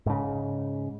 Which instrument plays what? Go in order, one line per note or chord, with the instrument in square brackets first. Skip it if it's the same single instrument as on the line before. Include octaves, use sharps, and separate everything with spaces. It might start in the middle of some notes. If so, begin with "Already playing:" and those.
[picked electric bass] G#2 C#3